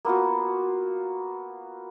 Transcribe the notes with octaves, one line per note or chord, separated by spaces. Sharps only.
A#3 B3 F4 F#4